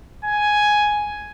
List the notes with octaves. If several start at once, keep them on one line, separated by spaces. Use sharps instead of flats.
G#5